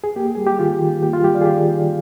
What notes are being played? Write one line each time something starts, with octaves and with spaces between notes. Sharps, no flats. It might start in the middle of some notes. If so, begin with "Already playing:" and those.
G#4
A#3 G4
G3 G#4
G4
D#3 F4
D#3
A#3 G4
F4
G3 G4
D5 F5
G#4
D#3 G4
D#3